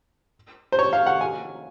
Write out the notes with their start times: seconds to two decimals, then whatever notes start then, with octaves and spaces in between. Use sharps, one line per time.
0.72 C5
0.79 C#5
0.93 F5
1.06 F#5
1.21 G#5